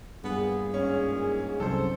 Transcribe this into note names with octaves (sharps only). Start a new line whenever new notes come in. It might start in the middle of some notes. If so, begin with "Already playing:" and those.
G2 A#2 B3 G#4
G#2 C#4
C2 F#2 A4 C5